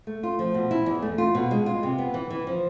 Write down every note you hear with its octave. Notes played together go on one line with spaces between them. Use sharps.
A3
F4
F3
B2
E4
E2
A3
F4
B2
G#3
F4
C3
B3
E3
E3
F3